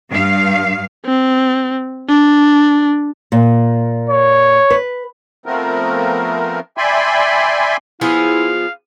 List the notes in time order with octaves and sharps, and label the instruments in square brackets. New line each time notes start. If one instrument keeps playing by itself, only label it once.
[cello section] G2 F5
[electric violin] C4
D4
[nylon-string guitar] A#2
[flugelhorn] C#5
[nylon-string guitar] B4
[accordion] F3 A3 B3 C4 A#4
D5 E5 G5 G#5 B5 C6
[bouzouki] F3 B3 G#4 [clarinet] E4 [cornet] F5